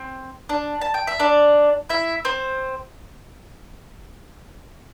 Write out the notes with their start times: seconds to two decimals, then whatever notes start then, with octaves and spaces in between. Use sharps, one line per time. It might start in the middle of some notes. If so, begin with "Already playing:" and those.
Already playing: C4
0.49 D4
0.81 A5
0.94 G5
1.07 E5
1.19 D4 D5
1.89 E4 E5
2.25 C4 C5